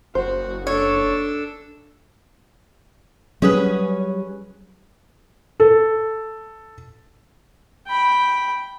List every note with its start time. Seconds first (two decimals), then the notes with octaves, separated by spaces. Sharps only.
0.15 F#1 F#4 C5
0.67 D4 A4 C#5
3.42 F#3 G3 C#4 G#4 B4
5.60 A4
7.87 G5 B5